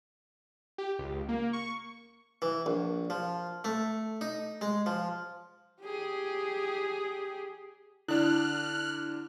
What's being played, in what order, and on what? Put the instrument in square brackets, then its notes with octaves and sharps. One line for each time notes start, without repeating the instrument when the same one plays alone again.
[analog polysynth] G4
C#2
A#3
C#6
[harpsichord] E3
A#1
F3
A3
D#4
G#3
F3
[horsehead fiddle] G4 G#4
[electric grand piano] D3 D4 [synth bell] E4 [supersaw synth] F6 F#6